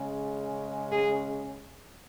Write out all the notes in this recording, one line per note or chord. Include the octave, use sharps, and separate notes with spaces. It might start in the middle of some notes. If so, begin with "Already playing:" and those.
Already playing: C#3 G#3 C#4
G#4